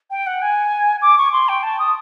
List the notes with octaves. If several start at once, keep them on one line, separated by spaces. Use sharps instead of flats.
G5
F#5
G#5
D6
C#6
C6
G5
A5
D#6